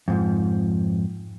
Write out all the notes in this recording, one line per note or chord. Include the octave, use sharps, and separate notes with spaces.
F2 G#2 F3